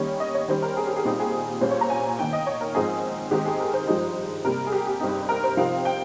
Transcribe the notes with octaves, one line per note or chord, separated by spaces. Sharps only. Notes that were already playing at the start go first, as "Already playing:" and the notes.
Already playing: D#3 G3 A#3 C#4 C#5
D#5
C#5
D#3 G3 C#4 C5
A#4
G#4
G4
G#4
A#2 G3 C4 D#4 G4
G#4
A#2 G3 C#4 C5
C#5
A#5
G#5
D#3 A#3 D#4 G5
D#5
C#5
A#4
G#2 F3 C4 D#4 G#4
D#3 G#3 C4 D#4 G4
G#4
A#4
C5
G2 F3 G#3 D#4
C3 G3 A#3 A#4
G#4
G4
G4
G2 G3 C4 D#4
A#4
C5
C3 F3 C4 D#4 F5
G5